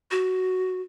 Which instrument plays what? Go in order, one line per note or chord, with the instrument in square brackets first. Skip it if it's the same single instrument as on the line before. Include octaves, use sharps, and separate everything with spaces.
[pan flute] F#4